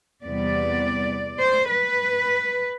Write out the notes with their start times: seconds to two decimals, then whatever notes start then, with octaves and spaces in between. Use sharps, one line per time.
0.24 E2 C3 G3 B3 D5
1.39 C5
1.69 B4